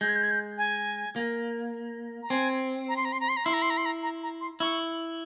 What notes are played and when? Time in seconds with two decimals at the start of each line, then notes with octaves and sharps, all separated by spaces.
0.01 G#3 G6
0.09 G#6
0.16 G6
0.24 G#6
0.31 G6
0.58 G#5
1.16 A#3
2.23 A#5
2.30 C4 G#5
2.89 A#5
2.97 C6
3.05 A#5
3.13 C6
3.20 A#5
3.29 C6
3.37 A#5
3.45 E4 C6
3.54 A#5
3.62 C6
3.70 A#5
3.77 C6
3.86 A#5
4.03 A#5
4.23 A#5
4.41 C6
4.60 E4 C#6